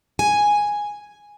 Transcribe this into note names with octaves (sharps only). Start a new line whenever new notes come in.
G#5